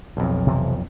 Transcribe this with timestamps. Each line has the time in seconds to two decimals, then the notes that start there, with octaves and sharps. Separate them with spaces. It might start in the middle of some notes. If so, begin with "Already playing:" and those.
0.17 B1 F2
0.47 C3 E3 F3